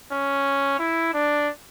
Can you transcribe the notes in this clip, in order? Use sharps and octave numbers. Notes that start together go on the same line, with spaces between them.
C#4
E4
D4